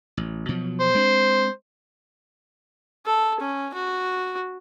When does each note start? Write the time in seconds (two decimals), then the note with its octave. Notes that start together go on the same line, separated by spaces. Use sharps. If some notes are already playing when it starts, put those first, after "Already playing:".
0.17 A1
0.49 B2 F3 F#3
0.80 C5
0.95 G#3 C4 D4
3.06 A4
3.40 C#4
3.74 F#4